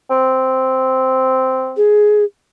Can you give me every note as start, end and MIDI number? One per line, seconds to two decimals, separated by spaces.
0.10 1.78 60
1.77 2.24 68